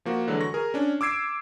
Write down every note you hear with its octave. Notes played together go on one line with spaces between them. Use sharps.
F3 A#3 F#4
D3 E3 F#3 G#3
C#6 A#6
G#4 A#4
C#4 D4
D6 E6 G#6 C7 D7